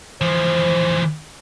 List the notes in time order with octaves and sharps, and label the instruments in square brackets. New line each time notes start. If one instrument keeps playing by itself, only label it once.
[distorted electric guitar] E3 F3 [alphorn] C5